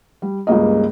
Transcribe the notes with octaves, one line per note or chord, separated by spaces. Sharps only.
G3
C#2 G2 C#3 A#3 D#5